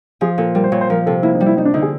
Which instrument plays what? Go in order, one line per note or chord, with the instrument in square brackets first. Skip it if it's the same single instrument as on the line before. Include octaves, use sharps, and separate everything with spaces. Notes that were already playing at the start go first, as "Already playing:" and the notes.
[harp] F3 [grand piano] G#4
[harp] A#2 [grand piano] A4
[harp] G3 [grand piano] A#4
[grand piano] C5
[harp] A#2 [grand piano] C#5
[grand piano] C5
[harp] F3 [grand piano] A#4
[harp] C3 [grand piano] A4
[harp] A#3 [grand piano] E4
[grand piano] D#4
[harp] G3
[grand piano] E4
[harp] G3 [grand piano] D#4
[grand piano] D4
[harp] D3 [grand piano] D#4
[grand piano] G#4